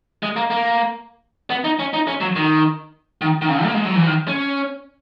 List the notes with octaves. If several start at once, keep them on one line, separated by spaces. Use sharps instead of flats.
G#3
A#3
A#3
B3
D#4
C#4
D#4
C#4
F#3
D#3
D#3
D#3
C#3
A#3
G#3
F#3
E3
D#3
C#4